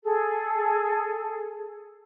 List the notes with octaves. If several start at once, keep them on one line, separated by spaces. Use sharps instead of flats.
G#4 A4